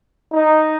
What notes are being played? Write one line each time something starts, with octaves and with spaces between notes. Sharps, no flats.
D#4